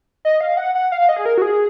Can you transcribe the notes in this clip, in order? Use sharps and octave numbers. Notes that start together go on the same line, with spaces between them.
D#5
F5
F#5
F#5
F5
D#5
G#4
A#4
F#4
G#4